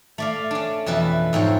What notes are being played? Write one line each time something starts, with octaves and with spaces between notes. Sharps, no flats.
A3 D5 F5
C#4 D4
F2 B2 E3 E4 B4
F2 G#2 C4 C#5